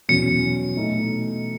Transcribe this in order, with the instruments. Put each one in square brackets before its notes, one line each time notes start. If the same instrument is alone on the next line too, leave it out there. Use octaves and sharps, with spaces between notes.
[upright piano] E2 B2 F#3 C#4 [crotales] C#7
[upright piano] B2 A3 D#4 A4